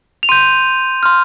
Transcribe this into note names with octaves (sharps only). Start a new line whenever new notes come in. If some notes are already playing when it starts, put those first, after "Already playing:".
F7
C6 G6 D#7
C6 F6